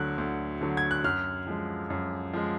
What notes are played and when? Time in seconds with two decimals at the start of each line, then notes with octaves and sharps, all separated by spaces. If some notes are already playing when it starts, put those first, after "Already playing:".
Already playing: D2 D3 F#3 F#6
0.18 D2
0.61 D3 F#3
0.77 G#6
0.91 F#6
1.04 F#2 F6
1.47 F3 G#3
1.90 F#2
2.33 F3 G#3